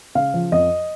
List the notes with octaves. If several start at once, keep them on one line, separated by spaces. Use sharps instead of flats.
C#3 F5
F3
F2 D#5